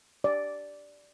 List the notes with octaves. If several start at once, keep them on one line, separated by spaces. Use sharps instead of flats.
D5